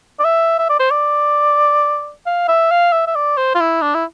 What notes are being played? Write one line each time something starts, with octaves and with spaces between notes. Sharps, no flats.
D5
E5
E5
D5
C5
D5
F5
E5
F5
E5
E5
D5
C5
F4
E4
D4
E4